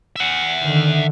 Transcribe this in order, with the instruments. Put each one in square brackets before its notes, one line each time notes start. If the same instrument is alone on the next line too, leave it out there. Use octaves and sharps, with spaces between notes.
[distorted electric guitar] E5 F#5
[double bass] D3 D#3